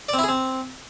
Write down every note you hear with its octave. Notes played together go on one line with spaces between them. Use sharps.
D5
C4
E4
G#4
C4